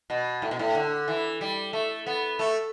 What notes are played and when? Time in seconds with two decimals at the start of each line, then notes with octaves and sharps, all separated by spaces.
0.10 B2
0.42 A2
0.51 B2
0.59 A2
0.75 D3
1.08 E3
1.41 G3
1.73 A3
2.06 B3
2.39 A3